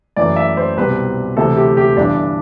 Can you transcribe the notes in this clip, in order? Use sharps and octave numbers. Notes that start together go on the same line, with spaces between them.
F#2 E3 A3 D5
E5
C5
C2 B2 G3 C4 B4
D2 C3 E3 A3 C4 A4
G4
G4
G1 G2 E3 D4